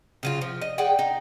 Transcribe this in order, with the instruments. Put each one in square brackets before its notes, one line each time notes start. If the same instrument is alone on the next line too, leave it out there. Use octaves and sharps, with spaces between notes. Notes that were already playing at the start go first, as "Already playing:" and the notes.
[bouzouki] C#3 F#3 F4
F3
D#5
G#4 D5 F#5 G5
D#4